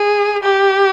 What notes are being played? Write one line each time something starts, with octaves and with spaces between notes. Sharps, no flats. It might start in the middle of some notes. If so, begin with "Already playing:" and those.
Already playing: G#4
G4